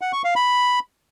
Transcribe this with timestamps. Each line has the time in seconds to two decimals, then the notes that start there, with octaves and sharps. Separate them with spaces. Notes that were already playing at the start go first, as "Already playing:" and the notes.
0.01 F#5
0.13 C#6
0.24 F5
0.36 B5